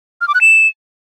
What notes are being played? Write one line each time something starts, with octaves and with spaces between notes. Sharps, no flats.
F6
D6
F#6
E7